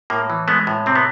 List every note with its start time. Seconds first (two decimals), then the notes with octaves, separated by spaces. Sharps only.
0.10 A2 A#3
0.30 E3
0.48 G#3 A3 B3
0.67 A2
0.86 C3 C4
0.96 B3